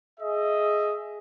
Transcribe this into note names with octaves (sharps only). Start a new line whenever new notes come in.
G#4 D#5 E5